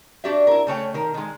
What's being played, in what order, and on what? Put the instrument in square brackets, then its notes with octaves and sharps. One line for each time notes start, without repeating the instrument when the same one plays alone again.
[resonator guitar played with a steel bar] D4 F#4 G4 D5 E5
E4 A#4
C#3 A3 C#5 G5
D#3 A#4
D#3 G#3